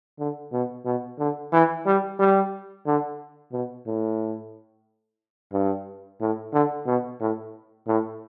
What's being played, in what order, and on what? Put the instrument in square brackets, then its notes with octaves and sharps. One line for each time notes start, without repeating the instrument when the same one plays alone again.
[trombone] D3
B2
B2
D3
E3
G3
G3
D3
B2
A2
G2
A2
D3
B2
A2
A2